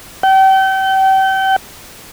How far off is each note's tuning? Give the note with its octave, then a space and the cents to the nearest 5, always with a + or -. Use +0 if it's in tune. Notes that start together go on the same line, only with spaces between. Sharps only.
G5 -35